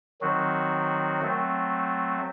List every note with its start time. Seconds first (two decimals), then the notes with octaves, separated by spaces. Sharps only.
0.21 D#3 F#3 C4 F#4
1.22 F#3 A3 C4